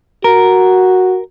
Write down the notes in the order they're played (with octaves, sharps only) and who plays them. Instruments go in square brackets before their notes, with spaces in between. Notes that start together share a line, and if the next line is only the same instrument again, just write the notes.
[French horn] F#4 [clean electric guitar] A#4